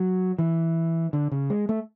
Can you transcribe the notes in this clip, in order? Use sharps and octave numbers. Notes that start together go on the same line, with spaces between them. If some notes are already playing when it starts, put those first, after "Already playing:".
Already playing: F#3
E3
D3
C#3
G#3
A3